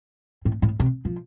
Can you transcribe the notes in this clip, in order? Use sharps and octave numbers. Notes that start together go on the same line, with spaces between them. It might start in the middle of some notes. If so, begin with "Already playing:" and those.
A2
A2
C3
F3